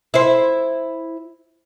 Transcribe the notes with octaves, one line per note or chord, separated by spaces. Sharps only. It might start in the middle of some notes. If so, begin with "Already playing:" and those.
E4 C5